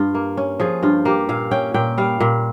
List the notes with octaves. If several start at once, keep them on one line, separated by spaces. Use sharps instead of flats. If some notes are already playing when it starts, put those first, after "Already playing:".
Already playing: G2 F4
A#3
C#4
F3 G#4
G2 F4
A#3 G4
A#2 F5
C#4 G5
A#2 G5
G3 F5
A#2